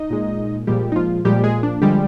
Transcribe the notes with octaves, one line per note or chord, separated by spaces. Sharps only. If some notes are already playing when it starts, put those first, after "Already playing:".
Already playing: D#4 D#5
A#2 G#3
A#2 F3 G3 G#3 G4
D#4
F3 F4
A#2 F3 G3 G#3 G4
G#3 G#4
D4
D3 F3 G3 G#3 G4